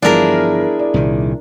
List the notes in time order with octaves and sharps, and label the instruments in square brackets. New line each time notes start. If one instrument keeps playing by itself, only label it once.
[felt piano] G1 E3 F3 [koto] D4 A#4 [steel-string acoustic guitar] E4 G#4
[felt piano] D5
[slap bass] C2 A#2 D#3